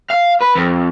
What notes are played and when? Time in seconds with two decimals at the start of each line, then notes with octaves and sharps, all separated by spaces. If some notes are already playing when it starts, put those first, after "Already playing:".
0.10 F5
0.42 B4
0.57 F2